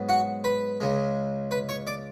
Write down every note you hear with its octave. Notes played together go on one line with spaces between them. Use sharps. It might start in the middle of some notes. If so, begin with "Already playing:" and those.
Already playing: G#2 F#3 B3
F#4 F#5
B4 B5
C#2 C#3 G#3
B4 B5
C#5 C#6
D5 D6